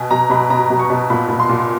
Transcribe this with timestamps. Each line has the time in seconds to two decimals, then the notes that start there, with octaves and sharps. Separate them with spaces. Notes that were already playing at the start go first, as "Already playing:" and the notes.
Already playing: B2 G#5
0.11 B2 A#5
0.30 B2 B5
0.50 B2 A#5
0.70 B2
0.79 C#6
0.90 B2
1.10 A#2 B5
1.28 A#2
1.39 C6
1.49 A#2